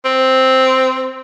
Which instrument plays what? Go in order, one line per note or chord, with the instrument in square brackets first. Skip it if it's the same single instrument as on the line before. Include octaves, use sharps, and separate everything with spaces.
[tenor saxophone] C4